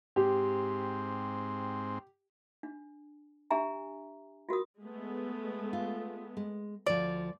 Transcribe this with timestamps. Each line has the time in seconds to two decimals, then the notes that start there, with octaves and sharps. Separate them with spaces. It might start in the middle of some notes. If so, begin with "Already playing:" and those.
0.16 G#2 C4 G4
2.63 D4
3.51 D4 G4 E5 G#5 A#5
4.49 F4 F#4 A#4 D#6
4.81 G#3 A3 B3
5.73 F4
6.37 G#3
6.86 D2 F3 D5